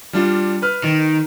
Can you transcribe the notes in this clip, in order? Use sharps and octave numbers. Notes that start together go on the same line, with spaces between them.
G3 D4 F4
B4 F6
D#3